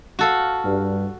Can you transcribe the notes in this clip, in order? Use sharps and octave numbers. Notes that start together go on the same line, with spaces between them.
F#4 A4 F5
G2